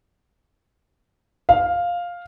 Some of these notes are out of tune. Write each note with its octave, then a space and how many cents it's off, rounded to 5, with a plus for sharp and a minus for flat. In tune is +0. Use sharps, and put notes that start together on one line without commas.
F5 +5